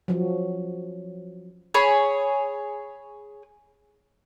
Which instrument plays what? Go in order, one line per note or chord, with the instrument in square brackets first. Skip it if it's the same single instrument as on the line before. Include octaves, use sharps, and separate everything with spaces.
[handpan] F3 F#3
[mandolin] G#4 C#5 B5